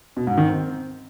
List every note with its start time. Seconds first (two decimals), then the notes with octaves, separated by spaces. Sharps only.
0.17 B2
0.27 G#2
0.37 D#3
0.48 C4